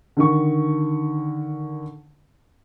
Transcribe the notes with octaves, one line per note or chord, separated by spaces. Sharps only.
D3 D#3 C#6